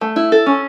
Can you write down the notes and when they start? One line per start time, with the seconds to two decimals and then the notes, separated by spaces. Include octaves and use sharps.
0.01 A3
0.16 E4
0.32 A4
0.46 C#4